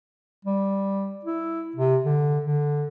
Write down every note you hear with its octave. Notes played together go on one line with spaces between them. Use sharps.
G3
E4
C3
D3
D3